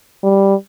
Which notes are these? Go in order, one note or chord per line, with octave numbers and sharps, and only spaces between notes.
G3